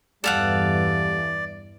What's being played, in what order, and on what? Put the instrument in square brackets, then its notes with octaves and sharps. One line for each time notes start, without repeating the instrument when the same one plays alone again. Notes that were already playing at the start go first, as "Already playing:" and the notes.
[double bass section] E2 G2 E3 [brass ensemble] G3 [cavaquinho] A4 F5 F#5 [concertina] D5